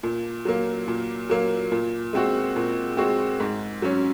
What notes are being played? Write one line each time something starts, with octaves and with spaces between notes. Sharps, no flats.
A#2
F#3 A#3
A#2
F#3 A#3
A#2
G#3 C4 F#4
A#2
G#3 C4 F#4
G#2
F#3 C#4